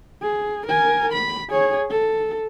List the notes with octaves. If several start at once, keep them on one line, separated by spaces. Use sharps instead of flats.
G#4
A#4 G#5
B5
G#4 C#5
A4